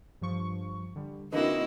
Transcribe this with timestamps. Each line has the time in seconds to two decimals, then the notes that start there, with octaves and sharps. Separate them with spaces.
0.21 G2 F3 C#6
0.96 D3 G3
1.32 D3 A#3 C4 D#4 E4 F#4 B4 D#5